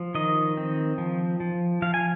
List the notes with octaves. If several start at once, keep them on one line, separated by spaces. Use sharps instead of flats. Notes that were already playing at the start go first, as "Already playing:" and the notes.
Already playing: F3
D#3 D#5
C4
F3
F3
F3 F5
G#5